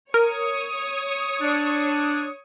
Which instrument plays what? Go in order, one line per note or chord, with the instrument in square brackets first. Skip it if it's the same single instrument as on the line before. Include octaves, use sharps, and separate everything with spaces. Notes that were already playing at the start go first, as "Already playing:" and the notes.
[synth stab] A#4 [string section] C#5 D#6
[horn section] D4